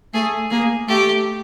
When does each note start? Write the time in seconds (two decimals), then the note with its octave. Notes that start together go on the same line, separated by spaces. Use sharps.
0.14 A3 G#4
0.50 A#3 G#4
0.88 A3 G4